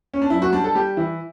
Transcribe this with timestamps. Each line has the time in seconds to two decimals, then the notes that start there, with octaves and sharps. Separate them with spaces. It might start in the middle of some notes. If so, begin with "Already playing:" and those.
0.14 C#4
0.22 D4
0.30 F#2 E4
0.42 F#4
0.53 G3 D4
0.64 A4
0.75 G3 G4
0.97 E3 E4